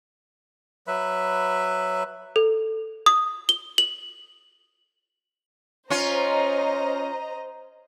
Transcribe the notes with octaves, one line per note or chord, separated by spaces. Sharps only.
F#3 B4 E5 B5
A4
D#6
G7
F#7
C#4 F4 C5 D#5 A#5